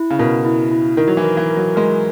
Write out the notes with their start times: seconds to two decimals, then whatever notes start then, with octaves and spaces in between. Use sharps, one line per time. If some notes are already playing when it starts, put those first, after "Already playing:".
Already playing: E4
0.10 C#3
0.19 B2 A#4
0.45 E4
0.71 E4
0.97 D#3 A#4
1.08 F#3
1.17 E3
1.24 A#4
1.37 E3
1.50 A#4
1.56 F#3
1.76 G#3 A#4